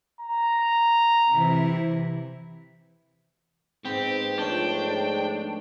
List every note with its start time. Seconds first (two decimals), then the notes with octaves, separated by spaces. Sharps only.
0.21 A#5
1.31 C3 E3 E4
3.85 G#2 B3 C4 G4
4.39 F3 A3 D4 C#5 G5